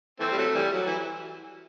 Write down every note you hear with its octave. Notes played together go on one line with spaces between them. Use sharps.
E3 A3 C4
G3
C3 F#3 A3
E3 G3
F#3
E3